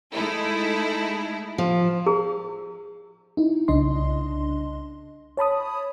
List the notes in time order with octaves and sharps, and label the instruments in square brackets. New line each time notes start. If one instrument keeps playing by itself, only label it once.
[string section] G#3 A3 D#4 E4 A4
[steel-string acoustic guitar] F3
[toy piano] G#4
[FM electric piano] D#4 E4
C2 C#3 D4 D#5 C6
C#5 A5 B5 D#6